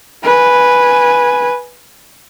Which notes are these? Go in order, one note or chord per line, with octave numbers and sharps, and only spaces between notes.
B4 G#5